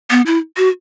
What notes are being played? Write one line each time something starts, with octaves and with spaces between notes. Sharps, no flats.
B3
E4
F#4